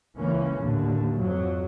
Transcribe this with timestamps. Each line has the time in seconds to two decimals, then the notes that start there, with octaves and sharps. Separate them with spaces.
0.17 C#2 E3 A#3 C#4
0.61 D#2 A2 D3
1.16 F2 G#2 F#3